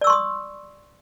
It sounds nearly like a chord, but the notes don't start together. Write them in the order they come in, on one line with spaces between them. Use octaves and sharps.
D5 E6 C#6 C6 D#6